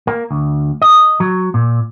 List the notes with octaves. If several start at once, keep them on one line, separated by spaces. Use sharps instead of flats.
A#3
D2
D#5
F#3
A#2